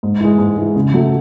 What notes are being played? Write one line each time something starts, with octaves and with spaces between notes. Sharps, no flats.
G#2
E3 G#3
G#2
E3 G#3
C#3
F#3 A3